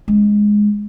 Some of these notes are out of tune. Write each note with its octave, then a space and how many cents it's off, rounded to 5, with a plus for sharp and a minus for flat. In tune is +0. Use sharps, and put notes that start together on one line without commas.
G#3 +0 C#4 +0